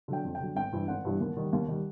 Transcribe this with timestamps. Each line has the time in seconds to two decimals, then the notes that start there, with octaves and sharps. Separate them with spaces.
0.08 D3 F#3 G5
0.25 F2
0.35 G5
0.40 D3 F#3
0.55 G#1 G5
0.72 G2 E3 G3
0.88 G#1 F#5
1.05 G2 E3 G3
1.20 D#2
1.37 D#3 G3
1.53 D#2
1.68 D#3 G3